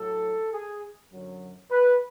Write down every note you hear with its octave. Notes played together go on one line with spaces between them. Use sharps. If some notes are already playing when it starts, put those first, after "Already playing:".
Already playing: A2 F#3 A4
G#4
F#2 D3 F#3
B4